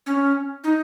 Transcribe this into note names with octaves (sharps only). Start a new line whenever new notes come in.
C#4
D#4